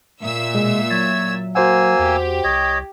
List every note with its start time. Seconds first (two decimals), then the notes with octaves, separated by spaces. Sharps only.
0.22 A#2 E5 E6
0.55 B2 G#3
0.91 F#3 C#5 A6
1.55 A#3 F#4 C5 F#5 G#5 E6
1.99 E2 G4
2.44 C2 C#5 D#5